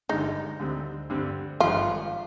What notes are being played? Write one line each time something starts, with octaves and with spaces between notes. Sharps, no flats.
G1 G2 D3 G#3 D#4
D2 D3 G3 C4
G2 D3 G3 C4
G#1 G2 F3 F4